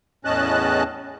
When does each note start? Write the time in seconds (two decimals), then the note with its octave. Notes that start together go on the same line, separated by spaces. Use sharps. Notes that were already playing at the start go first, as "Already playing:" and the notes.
0.25 E2 A2 C#4 D#5 A5 F#6